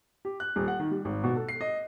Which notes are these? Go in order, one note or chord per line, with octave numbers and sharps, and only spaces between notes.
G4
F#6
D#1
F#5
D#3
G3
G#1
B2
A4
C7
D#5